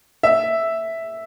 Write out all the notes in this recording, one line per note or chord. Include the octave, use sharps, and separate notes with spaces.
E5